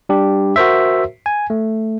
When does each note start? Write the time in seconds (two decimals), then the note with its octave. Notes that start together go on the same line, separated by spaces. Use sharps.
0.09 G3 D4 G4
0.56 F#4 A#4 C5 E5
1.26 G#5
1.50 A3